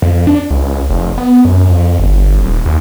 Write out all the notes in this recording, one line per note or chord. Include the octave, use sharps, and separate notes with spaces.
F2
D4
C#2
F1
B3
F#2
F2
G1
D#1
D#2